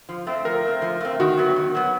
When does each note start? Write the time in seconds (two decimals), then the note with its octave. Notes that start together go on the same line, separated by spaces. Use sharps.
0.09 F3
0.27 A3 C4
0.45 F3 A#4
0.63 A3 C4
0.82 F3
1.00 A3 C4
1.20 D#3 F#4
1.37 F#3 B3
1.56 D#3
1.75 F#3 B3